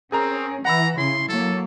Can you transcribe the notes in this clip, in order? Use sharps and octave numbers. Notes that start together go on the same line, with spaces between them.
C4 C#4 G#4 A#4 A#5
E3 F#5 A#5 B5 E6
C#3 E4 C6
F#3 A#3 A4